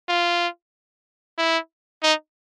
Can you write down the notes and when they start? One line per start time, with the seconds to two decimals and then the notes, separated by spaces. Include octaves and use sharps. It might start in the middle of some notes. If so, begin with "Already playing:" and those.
0.09 F4
1.38 E4
2.03 D#4